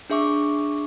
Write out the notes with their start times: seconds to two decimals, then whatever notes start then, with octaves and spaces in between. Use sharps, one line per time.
0.10 D4 G#4 E5 C#6 D6